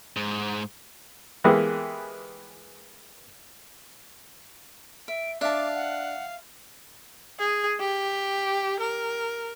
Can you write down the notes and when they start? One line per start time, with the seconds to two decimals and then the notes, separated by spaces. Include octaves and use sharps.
0.16 G#2
1.44 E3 G#3 A#3 B3 G4 G#4
5.08 E5 D7
5.41 D4 E5 F5 A5 D6
5.75 F#5
7.39 G#4
7.80 G4
8.80 A#4